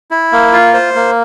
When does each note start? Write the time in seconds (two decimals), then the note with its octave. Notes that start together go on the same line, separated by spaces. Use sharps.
0.11 E4
0.32 A#3
0.53 F4
0.74 C5
0.95 A#3